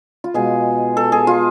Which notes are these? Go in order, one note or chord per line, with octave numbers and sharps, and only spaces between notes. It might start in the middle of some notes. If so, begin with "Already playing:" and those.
F4
B2 G#3 G#4
A4
G#4
F4